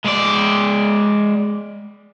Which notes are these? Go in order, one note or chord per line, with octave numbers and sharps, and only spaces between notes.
G#3 D5